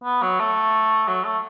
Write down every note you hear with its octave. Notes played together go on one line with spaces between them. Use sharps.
B3
F#3
A3
F#3
A3